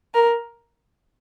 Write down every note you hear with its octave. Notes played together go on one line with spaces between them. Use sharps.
A#4